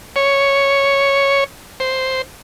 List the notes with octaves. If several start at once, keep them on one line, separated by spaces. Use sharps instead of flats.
C#5
C5